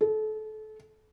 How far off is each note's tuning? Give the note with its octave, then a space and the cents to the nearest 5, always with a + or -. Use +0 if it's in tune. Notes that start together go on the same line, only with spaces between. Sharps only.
A4 -30